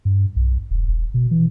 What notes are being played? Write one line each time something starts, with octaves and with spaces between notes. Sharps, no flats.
G2
B1
E1
E1
B2
E3